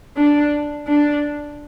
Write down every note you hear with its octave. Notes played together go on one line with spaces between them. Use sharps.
D4
D4